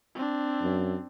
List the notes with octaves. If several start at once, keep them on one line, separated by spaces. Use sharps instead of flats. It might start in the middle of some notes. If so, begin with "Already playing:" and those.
C4 D4
F#2